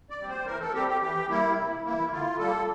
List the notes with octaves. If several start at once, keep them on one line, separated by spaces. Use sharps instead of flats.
D5
G3 C4
C5
E3 A#4
A4
G3 C4 G4
G4
E3 G4
G3 A#3 E4
C3
E3 A#3 E4
D3 F4
G3 A#3 A4